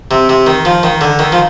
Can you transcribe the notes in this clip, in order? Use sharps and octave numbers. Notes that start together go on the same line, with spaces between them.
C3
C3
D#3
F3
D#3
D3
D#3
F3